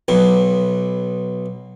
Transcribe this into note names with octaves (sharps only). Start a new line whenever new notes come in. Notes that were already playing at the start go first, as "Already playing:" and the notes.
B1 B2